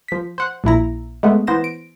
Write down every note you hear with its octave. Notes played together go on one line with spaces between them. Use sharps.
F3 B6
C5 F#5
A#1 A#2 E4 A#5
G#3 A3 B3
E3 B3 C5 A#6 E7
D7